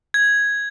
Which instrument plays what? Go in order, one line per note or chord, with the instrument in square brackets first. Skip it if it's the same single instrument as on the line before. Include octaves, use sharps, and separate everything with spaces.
[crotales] G#6